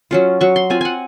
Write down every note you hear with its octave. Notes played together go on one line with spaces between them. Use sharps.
F#3 C#4 F4
F#3 C#6
C6
C4 F4 G#5
F#5 G#5